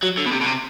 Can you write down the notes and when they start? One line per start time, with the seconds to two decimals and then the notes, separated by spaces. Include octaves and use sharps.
0.03 F#3
0.18 D3
0.26 B2
0.32 C3
0.42 B2
0.47 C3